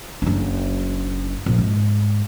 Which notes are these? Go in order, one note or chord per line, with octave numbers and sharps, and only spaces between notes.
F#1 D4
A#1
G#2